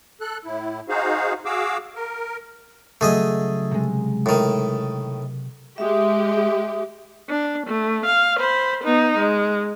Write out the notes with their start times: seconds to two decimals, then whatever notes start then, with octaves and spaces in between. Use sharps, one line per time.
0.21 A4 F#6
0.45 A2 E4
0.89 D#4 F#4 G#4 C5 F5
1.45 F#4 G#4 F5 D6 E6
1.96 A#4
3.01 C#3 F#3 A3 G#4 D#5
3.71 C3 G#3
4.26 A2 D#3
5.78 G#3 G4 E5 D#6
7.29 D4
7.66 A3
8.05 F5
8.39 C5 B5
8.84 B3 D#4
9.17 G#3